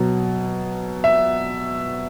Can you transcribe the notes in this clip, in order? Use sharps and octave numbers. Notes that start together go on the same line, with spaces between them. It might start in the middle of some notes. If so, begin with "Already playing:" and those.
Already playing: B2 F#3
E5